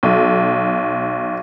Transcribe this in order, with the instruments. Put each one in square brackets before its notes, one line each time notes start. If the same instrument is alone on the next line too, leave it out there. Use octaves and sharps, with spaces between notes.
[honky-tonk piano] B1